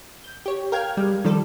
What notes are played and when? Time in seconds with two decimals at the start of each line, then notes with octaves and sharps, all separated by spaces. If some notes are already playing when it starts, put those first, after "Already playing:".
0.24 G6
0.46 G4 C#5
0.72 A#4 F5 G5 F6 G#6
0.97 G3 G#3
1.25 D#3 F3 G3 A4